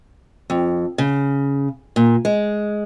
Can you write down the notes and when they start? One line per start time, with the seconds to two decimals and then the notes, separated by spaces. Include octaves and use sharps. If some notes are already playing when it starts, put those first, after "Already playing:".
0.50 F2
0.98 C#3
1.96 A#2
2.25 G#3